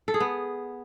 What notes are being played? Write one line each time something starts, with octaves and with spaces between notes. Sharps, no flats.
A4
G#4
B3